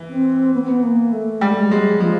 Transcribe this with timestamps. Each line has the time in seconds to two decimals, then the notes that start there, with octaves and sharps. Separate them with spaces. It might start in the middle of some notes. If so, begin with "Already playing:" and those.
Already playing: E3
0.09 C4
0.54 B3
0.61 C4
0.68 B3
0.83 A#3
1.12 A3
1.41 G3 G#3
1.51 A3
1.59 G#3
1.70 F#3 G#3
1.80 G3
1.88 F#3
2.00 F3 G#3